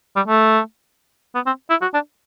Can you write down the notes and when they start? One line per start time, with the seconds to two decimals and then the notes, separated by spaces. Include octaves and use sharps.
0.16 G3
0.28 A3
1.35 B3
1.46 C4
1.70 E4
1.82 F#4
1.94 D4